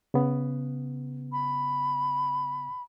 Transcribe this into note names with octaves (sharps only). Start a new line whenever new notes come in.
C#3 B3
B5